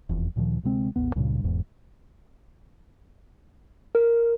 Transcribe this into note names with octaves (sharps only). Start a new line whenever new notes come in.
F1 E2
D2 A#2 D#3 F3
D2 C3 G#3 C4
A1 D#2 G#2 B3
C#2 G2 A#2 C#3
E1 E2 G#2
A#4